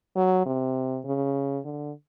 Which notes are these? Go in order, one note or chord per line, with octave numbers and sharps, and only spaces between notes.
F#3
C3
C#3
D3